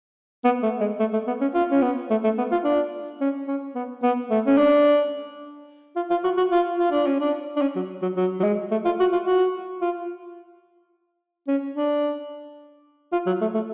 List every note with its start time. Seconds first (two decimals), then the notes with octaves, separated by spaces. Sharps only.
0.44 B3
0.63 A3
0.81 G#3
0.99 A3
1.13 A3
1.27 B3
1.41 C#4
1.54 F4
1.71 C#4
1.82 B3
2.10 A3
2.24 A3
2.38 B3
2.52 F4
2.64 D4
3.21 C#4
3.48 C#4
3.75 B3
4.03 B3
4.30 A3
4.46 C#4
4.57 D4
5.96 F4
6.10 F4
6.24 F#4
6.37 F#4
6.51 F4
6.79 F4
6.92 D4
7.07 C#4
7.20 D4
7.56 D4
7.61 C#4
7.76 F#3
8.02 F#3
8.17 F#3
8.40 F#3
8.43 G#3
8.71 A3
8.85 F4
9.00 F#4
9.12 F4
9.26 F#4
9.81 F4
11.48 C#4
11.75 D4
13.12 F4
13.27 F#3
13.41 A3
13.54 A3